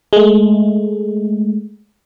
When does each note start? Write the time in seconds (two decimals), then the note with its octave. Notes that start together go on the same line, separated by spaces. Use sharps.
0.13 G#3 A3